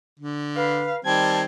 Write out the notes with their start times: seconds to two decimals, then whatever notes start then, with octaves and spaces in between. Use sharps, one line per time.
0.20 D3
0.56 B4 F5
1.05 D#3 G3 C4 A5 G#6